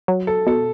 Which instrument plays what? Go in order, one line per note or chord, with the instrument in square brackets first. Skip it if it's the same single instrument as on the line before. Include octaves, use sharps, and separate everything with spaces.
[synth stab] F#3
[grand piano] A4
[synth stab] B2 [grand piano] A4